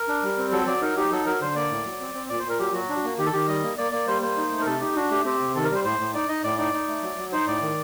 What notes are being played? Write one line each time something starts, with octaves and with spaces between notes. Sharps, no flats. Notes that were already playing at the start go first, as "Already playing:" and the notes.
Already playing: A#4
D4
G3
C4
F#3 A4
F#3 D5
D#4 A#4
D#4 G4
F#3 A4
F#3 A#4
D3 C5
A#3 D5
A2
F#3
C4
C4
A#2 D5
C5
A#2
A#4
F#3 G4
F#3 F#4
D4
A#3
D#3 G4
A4
D#3 G4
G3 D#5
A#3
A#3 D5
A#3 D5
G3 C5
A#3 C5
D#4
A3
A#4
C3 A4
D#4 G4
D4 F#4
A3 G4
C4 G4
C3
D#3 A4
A#4
G3 C5
A2 C5
A2
D#4 D5
D#4 D#5
A2 D5
D#4 D5
D#4
A3
F#3
F#3
D#4 C5
A2 D5
D#3